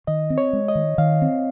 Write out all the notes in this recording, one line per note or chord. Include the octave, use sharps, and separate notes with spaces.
D#3 D#5
C4
C#5
G#3
D#5
D#3
D#3 F5
C4